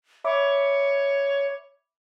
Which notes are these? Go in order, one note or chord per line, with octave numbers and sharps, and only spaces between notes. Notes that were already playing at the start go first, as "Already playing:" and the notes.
C#5 E5 B5 D6